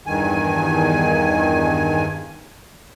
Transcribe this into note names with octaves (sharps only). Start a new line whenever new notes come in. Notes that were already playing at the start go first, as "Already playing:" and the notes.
E2 G2 D#3 G#5